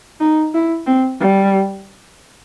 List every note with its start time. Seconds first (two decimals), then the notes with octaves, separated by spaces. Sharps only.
0.20 D#4
0.54 E4
0.86 C4
1.20 G3